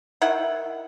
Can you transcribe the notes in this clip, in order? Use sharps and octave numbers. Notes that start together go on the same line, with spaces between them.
D#3 E4 F#5